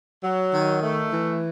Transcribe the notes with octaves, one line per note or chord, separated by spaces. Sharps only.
F#3
D#3
A3
E3